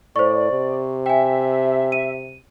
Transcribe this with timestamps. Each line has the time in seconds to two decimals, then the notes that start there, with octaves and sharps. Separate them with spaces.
0.16 A2 C5 D5 C#6
0.51 C3
1.06 E5 G5 G#5
1.92 D#7